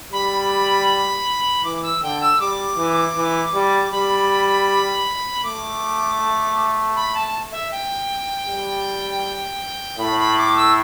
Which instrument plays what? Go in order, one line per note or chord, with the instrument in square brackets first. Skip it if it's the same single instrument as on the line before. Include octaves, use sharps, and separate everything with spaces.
[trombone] G3 [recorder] B5
[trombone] E3 [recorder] D6
[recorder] E6
[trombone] D3 [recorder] G5
[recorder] E6
[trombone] G3 [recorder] D6
[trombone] E3
E3
G3
[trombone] G3 [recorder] B5
[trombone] A3 [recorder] D6
[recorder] B5
A5
E5
G5
[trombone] G3
[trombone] A2 [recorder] B5
[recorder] B5
D6
E6